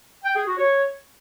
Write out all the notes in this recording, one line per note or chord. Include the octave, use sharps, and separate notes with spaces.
G5
G#4
F#4
C#5